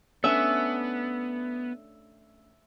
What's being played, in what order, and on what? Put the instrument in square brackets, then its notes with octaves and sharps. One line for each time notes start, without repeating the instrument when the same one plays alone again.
[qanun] A3 C#4 D4 [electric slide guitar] B3 [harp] E5